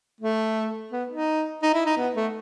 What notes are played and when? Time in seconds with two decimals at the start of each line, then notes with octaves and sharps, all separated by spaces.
0.21 A3
0.91 B3
1.09 D#4
1.62 D#4
1.73 E4
1.86 D#4
1.97 B3
2.15 A3